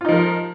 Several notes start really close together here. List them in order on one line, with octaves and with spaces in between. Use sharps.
F4 D#4 F3 A#4